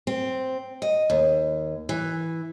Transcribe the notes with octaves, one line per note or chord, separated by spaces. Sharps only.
C4
D#5
D#2
E3